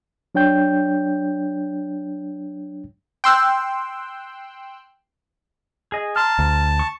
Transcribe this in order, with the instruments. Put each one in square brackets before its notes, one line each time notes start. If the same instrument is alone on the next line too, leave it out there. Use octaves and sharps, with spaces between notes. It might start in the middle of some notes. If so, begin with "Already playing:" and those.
[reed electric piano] F#3 D4 C#5 G5 G6
[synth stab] G5 C6 E6 F#6
[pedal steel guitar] G#4 D#5
[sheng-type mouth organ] A5 [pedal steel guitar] A#5 C6 F6
[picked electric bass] D2
[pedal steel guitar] C#6